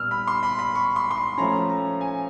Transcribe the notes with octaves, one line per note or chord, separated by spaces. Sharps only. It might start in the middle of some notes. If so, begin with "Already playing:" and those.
Already playing: A#2 G3 B3 E6 F6
B5
C6
B5
B5
C#6
C6
C6
B5
F3 A3 C#4 A#5
A#5
G#5